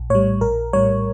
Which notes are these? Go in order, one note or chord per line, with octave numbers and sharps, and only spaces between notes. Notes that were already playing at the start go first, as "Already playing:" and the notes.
Already playing: A#1
A2 G3 C#5
A#1 A#4
A2 G3 C#5